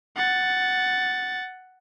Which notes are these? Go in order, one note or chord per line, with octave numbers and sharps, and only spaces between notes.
F#5 A6